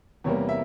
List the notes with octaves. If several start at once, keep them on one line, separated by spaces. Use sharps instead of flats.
E2 C3 G3 A#3 C#5
E5